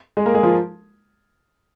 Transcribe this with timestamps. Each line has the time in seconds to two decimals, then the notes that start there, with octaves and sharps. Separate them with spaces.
0.17 G#3 G#4
0.26 A#3 A#4
0.34 G#3 G#4
0.43 F3 F4